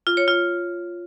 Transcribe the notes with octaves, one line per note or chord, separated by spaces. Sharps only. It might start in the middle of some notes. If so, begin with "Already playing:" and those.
F4
C#5
F4